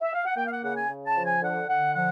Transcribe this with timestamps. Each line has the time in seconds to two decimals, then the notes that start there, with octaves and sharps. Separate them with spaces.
0.02 E5
0.13 F5
0.25 F#5
0.37 A#3 G5
0.46 F5
0.50 F#5
0.64 C#3 F#5
0.76 G#5
0.90 C#3
1.06 A5
1.16 F3
1.25 G#5
1.42 D3 F#5
1.68 D3 F#5
1.95 F3 F#5